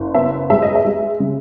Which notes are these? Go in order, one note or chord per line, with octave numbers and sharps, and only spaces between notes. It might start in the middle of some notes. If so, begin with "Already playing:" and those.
Already playing: F#1
B3 E5
G#3 E5
D#5
E5
G#3
C#3